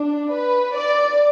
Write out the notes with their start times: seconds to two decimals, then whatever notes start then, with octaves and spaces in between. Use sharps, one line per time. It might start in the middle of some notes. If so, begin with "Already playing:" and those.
Already playing: D4
0.33 B4
0.75 D5